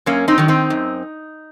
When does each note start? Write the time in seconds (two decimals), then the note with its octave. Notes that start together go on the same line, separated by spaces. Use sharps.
0.06 F#2 A#3 C#4
0.28 C4 D#4
0.38 D#3 F#3
0.48 C4 D#4
0.70 F#2